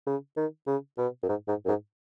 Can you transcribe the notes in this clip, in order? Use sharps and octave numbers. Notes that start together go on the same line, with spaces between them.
C#3
D#3
C#3
B2
F#2
G#2
G#2
F#2
G#2